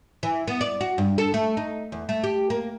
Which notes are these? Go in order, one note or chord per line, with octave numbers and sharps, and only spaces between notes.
E3
B3
D5
F#4
G2
A4
A3
D#4
E2
A3
G4
A#3